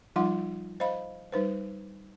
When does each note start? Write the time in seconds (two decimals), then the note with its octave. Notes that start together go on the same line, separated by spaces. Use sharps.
0.16 F3 G3 D#4 F4 F#5 C6
0.80 C5 D#5 F5 B5
1.32 G3 D#4 B4 C5